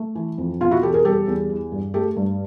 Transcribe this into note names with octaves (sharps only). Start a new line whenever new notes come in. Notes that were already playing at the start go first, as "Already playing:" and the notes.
Already playing: A3
E3
F2
B2 F4
E4 F#4
E2 G4 A4
G#4 A#4
G3 G4 A4
E2
E3
G2
A3 G4 A4
G2